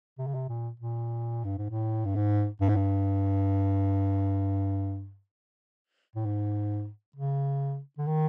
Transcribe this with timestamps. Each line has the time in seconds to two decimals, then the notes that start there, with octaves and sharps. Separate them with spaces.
0.19 C3
0.27 C#3
0.34 C3
0.49 A#2
0.80 A#2
1.44 G2
1.58 G#2
1.70 A2
2.05 G2
2.16 G#2
2.61 G2
2.69 G#2
2.76 G2
6.16 A2
6.25 G#2
7.16 C#3
7.98 D3
8.07 D#3